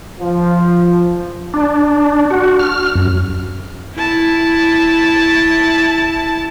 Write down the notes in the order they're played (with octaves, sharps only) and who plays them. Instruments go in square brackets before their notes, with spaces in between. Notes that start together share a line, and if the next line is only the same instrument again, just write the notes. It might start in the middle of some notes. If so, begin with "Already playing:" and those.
[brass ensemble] F3
[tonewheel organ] D4
F#4
F6
F#2
[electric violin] E4 A5